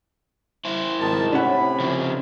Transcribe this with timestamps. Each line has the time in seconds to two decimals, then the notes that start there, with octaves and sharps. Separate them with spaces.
0.65 E4 C5
1.00 G#1 D#3 A5
1.32 A2 C3 C#4 F#5 B5
1.80 C#3 F3